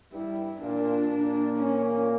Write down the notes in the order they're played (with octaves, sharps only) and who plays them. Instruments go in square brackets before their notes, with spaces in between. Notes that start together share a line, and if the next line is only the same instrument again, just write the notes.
[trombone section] G2 G3 [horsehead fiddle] E4
[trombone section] A#2 A#3 [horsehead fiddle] D4
[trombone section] A#2 A#3
[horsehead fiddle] C#4